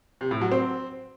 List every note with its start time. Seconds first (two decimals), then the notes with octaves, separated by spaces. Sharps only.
0.21 C3
0.31 A2
0.41 F#3
0.52 C4